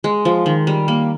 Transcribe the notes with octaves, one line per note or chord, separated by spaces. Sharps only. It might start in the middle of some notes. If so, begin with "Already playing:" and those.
G#3
F3
D#3
G3
A#3